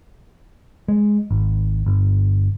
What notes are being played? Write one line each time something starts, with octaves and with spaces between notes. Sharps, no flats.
G#3
G#1
G1